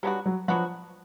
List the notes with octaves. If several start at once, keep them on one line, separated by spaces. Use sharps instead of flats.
F#3 G3 B3 D4 F#4
F#3
F3 F#3 B3 D4 F#4